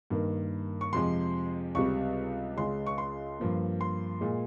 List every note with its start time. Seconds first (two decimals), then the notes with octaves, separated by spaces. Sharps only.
0.10 G2 D#3 A#3
0.81 C#6
0.93 F2 C3 F3 G#3 C6
1.75 C#2 C3 G3 C#6
2.57 C#2 C#3 G#3 C6
2.87 C#6
2.98 C6
3.39 G2 F3 A#3
3.81 C6
4.21 A#2 G#3